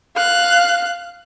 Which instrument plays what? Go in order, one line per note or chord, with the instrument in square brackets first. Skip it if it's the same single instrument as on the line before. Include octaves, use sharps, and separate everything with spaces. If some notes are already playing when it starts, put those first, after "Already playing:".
[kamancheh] F5 F#6